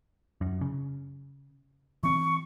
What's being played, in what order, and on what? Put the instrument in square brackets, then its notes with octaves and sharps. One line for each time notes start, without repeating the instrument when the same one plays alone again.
[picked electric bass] F#2
C#3
[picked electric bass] E3 C4 [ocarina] C#6